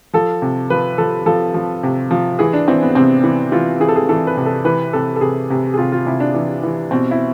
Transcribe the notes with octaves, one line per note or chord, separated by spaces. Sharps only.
F3 A4
C3
F3 B4
F3 A4
F3 A4
F3
C3
F3
E3 G#4
D4
E3 C4
B3
C3 C4
E3
E3 F4
E3 G#4
A4
G#4
E3 A4
B4
C3
A4
E3 B4
C3 A4
A4
C3 G#4
C3
G#4
C3 F4
F4
C3 E4
D4
E3
E3
B2 C4
E4